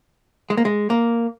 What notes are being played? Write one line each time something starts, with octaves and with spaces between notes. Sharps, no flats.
G#3
A#3
G#3
A#3